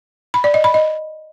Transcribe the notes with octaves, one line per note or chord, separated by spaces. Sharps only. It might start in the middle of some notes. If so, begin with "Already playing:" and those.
B5
D5
D#5
B5
D#5